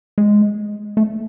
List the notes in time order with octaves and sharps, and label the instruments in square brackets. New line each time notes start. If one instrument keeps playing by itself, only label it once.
[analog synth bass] G#3
A3